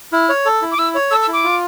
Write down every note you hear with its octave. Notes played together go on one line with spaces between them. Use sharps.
E4 F6
C#5
A4
E4
D6
E4 E6
C#5
A4 E6
E6
E4
D6
F4